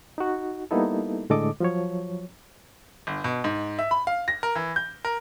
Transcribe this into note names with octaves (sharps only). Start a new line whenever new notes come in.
D#4 F#4
G3 A#3 B3 D#4 E4 A4
A2 D3 G#3 A4 D#5 D6
F3 F#3 C#5
G1
B2
G#2
E5
B5
F5
A#6
A#4
E3
G6
A#4